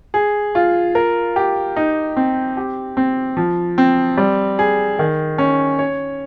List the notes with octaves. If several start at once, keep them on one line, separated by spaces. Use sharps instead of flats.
G#4
F4
A#4
G4
D#4
C4
G4
C4
F3
C4
G3
G#4
D#3
C#4
C#5